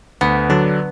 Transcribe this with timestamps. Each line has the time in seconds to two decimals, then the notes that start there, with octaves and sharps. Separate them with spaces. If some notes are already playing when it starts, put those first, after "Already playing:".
0.21 D2 B3
0.49 D3 F#3 D4